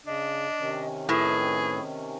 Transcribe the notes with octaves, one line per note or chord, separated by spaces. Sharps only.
C#3 D4 D#5
C3 D#3 C#4
A2 G#4 B4